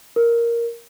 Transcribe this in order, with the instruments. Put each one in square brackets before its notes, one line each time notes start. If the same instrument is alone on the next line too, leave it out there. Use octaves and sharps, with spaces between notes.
[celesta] A#4